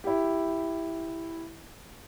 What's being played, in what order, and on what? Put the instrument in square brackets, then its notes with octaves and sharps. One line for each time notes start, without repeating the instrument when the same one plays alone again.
[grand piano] E4 G4